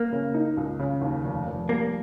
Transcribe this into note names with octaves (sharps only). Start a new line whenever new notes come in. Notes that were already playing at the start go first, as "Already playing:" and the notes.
Already playing: A#3
C#3
D#4
C#2
C#3
D#2
F1
F1
G3 A#3